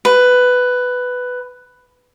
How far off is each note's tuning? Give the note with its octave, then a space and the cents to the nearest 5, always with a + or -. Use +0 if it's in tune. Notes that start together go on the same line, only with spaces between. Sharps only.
B4 +10